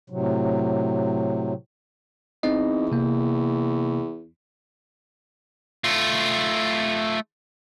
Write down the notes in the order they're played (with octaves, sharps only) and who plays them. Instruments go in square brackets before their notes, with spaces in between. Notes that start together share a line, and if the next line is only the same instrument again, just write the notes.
[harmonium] A2 C3 F#3
[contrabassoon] E2 [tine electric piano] C4 D#4 D#5
[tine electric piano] C3 A#3
[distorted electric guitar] A3 F4